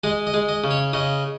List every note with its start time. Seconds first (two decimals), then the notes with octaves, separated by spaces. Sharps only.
0.03 G#3 D#5
0.27 D#5
0.34 G#3
0.49 D#5
0.64 C#3
0.71 C#5
0.93 C#3 D#5